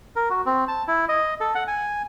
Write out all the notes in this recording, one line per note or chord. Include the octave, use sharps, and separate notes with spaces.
A#4
F#4
C4
A5
E4
D#5
A4
F#5
G#5